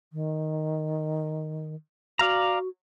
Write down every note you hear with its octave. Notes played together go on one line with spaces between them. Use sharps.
D#3
F#4 D5 F5 A#5